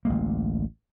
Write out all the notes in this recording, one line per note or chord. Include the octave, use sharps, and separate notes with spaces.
A1 D2 G#3 A#3